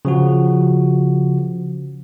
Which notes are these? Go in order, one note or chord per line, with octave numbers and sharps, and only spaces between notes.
C#3 F3 F#4